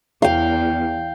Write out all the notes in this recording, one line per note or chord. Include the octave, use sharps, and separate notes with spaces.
E2 F5 G5